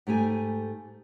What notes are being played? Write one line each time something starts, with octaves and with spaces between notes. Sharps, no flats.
G#2 A3 G4 G#5